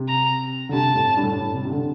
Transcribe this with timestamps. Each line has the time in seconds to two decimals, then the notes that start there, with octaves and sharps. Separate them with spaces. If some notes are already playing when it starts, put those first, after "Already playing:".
Already playing: C3
0.08 A#5
0.69 D3
0.73 C3 A5
0.95 A2
1.17 G2
1.23 A2
1.31 G2
1.39 A2
1.54 C3
1.65 C3
1.71 D3